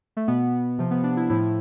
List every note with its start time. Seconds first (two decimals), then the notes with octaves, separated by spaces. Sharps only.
0.17 A3
0.28 B2 B3
0.78 C3 F3
0.91 B3
1.04 D4
1.17 E4
1.30 A2 F3 E4